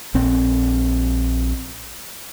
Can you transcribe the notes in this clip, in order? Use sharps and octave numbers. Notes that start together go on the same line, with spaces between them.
A#1 C4